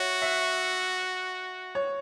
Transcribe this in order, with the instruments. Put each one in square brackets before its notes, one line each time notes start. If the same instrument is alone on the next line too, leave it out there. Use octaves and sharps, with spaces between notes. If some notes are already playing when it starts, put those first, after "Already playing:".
Already playing: [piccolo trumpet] F#4 [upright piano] C#5 E5
[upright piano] E5
C#5